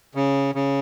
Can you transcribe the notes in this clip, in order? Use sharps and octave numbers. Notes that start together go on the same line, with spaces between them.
C#3
C#3